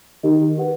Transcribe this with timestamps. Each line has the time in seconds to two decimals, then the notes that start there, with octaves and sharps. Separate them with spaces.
0.23 D#3 D#4 G4 D#5
0.58 G4 B4 F#5